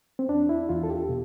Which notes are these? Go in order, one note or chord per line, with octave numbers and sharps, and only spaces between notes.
C4
E2 D4
E4
E2 F4
A4
G4
B2